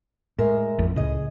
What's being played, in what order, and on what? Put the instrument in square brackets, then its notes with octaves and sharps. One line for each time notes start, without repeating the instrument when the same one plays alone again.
[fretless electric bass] A2 [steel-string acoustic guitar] G#3 A#4 E5
[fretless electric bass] A1 F2 A2
[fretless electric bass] C#2 A2 C#3 [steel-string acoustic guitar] G#4 D#5